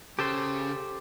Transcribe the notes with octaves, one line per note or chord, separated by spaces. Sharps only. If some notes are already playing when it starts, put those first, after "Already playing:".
C#3 G4 A4 C5